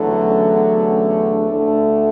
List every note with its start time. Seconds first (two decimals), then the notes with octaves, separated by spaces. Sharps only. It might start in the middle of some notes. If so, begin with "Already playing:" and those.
Already playing: E2 D3 F#3 A3
0.25 C#4
0.55 B3
0.87 C#4
1.18 D4
1.50 D2 D3 A3